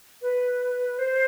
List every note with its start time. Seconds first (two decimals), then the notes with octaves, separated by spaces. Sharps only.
0.22 B4
0.99 C5